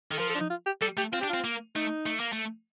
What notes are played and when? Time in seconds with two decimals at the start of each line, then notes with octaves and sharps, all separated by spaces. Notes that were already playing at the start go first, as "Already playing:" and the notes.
0.11 D#3 A4
0.19 F3 A#4
0.29 A4
0.35 D4
0.40 D#4
0.50 F4
0.66 G4
0.82 G3 A4
0.97 A3 G4
1.13 C4 F4
1.21 D4 G4
1.29 C4 F4
1.44 A#3
1.76 A3 D#4
2.06 A3
2.20 A#3
2.33 A3